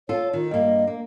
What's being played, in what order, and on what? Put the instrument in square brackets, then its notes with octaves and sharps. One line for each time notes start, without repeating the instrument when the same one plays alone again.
[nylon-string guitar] F4 A4 [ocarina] C#5
[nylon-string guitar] D#3 [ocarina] F4
[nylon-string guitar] G2 A#3 [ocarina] D#5
[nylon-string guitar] A#3